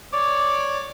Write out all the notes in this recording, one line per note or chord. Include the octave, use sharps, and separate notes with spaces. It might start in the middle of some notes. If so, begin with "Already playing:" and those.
C#5 D5 D6